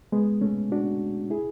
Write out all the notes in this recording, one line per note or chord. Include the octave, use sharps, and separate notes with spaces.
G#3 B3
A3 C#4
D4 F#4
E4 G#4